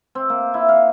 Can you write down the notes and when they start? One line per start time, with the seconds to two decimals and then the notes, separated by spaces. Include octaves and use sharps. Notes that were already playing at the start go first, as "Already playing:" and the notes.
0.15 C4
0.30 A#3
0.54 E4
0.69 F5